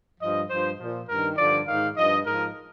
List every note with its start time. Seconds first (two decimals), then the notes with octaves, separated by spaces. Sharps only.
0.20 G2 F3 D#5
0.49 G2 F3 C5
0.79 A#2 F3
1.08 G2 D#3 A#4
1.37 G2 D3 F3 D5
1.66 G#2 D#3 F5
1.96 G2 F3 D#5
2.25 G#2 F3 A#4